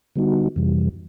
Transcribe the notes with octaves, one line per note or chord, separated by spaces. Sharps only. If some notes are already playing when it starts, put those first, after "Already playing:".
D3 G3 B3 D#4 F#4
F2 C3 E3 G3